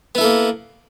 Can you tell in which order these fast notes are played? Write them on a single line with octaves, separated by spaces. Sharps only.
B3 E4 A4 A#3